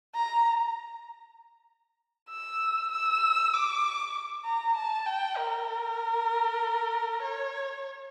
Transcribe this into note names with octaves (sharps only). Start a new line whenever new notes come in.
A#5
E6
E6
D6
A#5
A5
G5
A#4
C#5